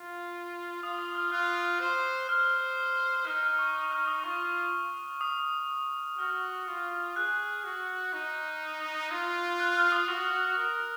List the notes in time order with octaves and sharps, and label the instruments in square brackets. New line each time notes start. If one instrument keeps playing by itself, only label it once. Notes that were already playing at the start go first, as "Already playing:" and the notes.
Already playing: [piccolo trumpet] F4
[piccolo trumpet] F4 [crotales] D#6
[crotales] D#6
F6
[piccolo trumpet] F4 [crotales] F#6
[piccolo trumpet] C5
[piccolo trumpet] C5 [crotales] F6
[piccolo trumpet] D#4 [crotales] F6
[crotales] F6
C#6
D#6
F6
D#6
[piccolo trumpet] F4 [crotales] C#6
[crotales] D#6
[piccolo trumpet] F#4 [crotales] F6
[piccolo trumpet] F4
[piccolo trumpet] G#4 [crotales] F#6
[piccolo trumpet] F#4
D#4
F4
[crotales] F#6
F6
D#6
[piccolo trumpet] F#4 [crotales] D#6
[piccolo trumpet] A#4